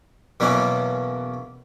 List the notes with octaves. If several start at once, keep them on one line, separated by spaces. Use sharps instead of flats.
E2 B2 F#3 A#3 C#4